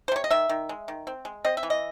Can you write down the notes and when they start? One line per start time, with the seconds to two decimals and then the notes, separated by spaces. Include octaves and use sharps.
0.08 C5
0.12 C3 C#5
0.24 D#5
0.31 D#3 E5
0.49 D#3
0.69 G#3
0.88 D#3
1.07 C4
1.25 G#3
1.45 C4 D#5
1.57 E5
1.63 E3
1.70 D#5